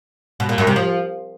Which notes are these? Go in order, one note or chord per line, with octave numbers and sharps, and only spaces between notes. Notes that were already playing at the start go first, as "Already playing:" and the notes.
B2
A#2
F#2
C3
F3